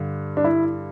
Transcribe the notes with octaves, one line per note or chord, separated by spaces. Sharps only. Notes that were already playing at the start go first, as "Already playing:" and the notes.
Already playing: G2 D3
D4
E4